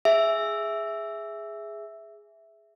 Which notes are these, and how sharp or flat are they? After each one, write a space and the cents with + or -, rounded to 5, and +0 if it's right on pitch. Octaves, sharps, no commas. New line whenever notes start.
G#4 +0 E5 +0